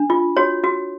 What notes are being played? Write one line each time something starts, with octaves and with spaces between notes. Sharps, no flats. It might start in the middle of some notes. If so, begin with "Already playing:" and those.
Already playing: D4
F4
F#4 C#5
F#4